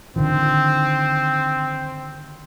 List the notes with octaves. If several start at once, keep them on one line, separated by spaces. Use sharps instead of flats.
D3 D#3 F3 C4